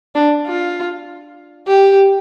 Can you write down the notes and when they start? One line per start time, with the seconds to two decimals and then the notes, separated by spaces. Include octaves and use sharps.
0.15 D4
0.46 F4
1.67 G4